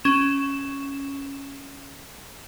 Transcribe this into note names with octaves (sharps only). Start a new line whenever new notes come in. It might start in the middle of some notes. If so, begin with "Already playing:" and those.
C#4 E7